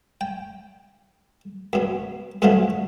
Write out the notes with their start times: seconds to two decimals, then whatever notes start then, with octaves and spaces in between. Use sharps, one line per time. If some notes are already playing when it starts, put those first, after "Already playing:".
0.21 G5
1.73 F#2 B2
2.42 F#2 B2 D3 F3 F#3 A3